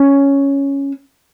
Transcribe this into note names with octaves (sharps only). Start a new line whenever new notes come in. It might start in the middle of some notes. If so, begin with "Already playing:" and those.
Already playing: C#4